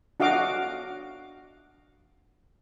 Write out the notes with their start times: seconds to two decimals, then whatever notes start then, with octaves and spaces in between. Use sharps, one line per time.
0.20 D4 F#4 D#5 F5 D6